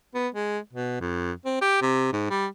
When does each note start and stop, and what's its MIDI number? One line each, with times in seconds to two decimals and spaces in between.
0.14 0.28 59
0.35 0.58 56
0.73 1.00 47
1.00 1.32 41
1.45 1.61 60
1.61 1.81 67
1.81 2.10 48
2.13 2.26 44
2.30 2.46 55